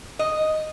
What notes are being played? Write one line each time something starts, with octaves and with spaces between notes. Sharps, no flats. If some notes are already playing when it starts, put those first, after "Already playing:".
D#5